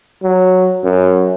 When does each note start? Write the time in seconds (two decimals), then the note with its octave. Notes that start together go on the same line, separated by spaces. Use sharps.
0.23 F#3
0.84 F#2